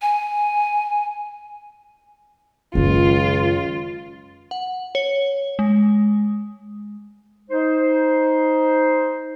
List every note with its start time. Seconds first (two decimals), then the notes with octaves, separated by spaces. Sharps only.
0.02 G#5
2.75 C#2 F#2 D#3 F4
4.51 F#5
4.95 C#5
5.59 G#3
7.50 D#4 C5